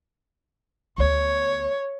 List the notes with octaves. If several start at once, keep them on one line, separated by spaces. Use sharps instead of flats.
D2 B3 C#5